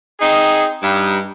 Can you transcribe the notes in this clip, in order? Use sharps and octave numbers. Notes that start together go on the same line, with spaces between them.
C4 D#4 G#4 A#5
G2 D#4